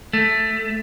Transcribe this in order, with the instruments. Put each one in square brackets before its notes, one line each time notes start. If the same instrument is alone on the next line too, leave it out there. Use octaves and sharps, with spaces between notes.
[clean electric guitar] A3